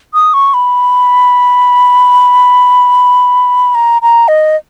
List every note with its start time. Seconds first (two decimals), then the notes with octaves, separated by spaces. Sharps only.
0.14 D#6
0.34 C#6
0.54 B5
3.75 A#5
4.02 A#5
4.28 D#5